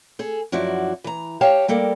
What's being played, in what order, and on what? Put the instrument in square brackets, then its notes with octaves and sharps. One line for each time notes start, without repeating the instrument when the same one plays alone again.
[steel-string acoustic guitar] G#4 A4
F#2 F3 E4 F#4 D5
E3 A#5
G4 C#5 F5 G5 A5
G3 A#3 A4 A#4 D5